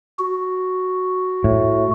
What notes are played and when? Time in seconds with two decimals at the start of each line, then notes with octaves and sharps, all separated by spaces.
0.19 F#4
1.44 A2